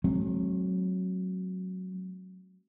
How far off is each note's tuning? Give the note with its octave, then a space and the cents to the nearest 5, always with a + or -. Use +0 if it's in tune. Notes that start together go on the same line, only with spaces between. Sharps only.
F#3 +0 A3 -45 C4 +35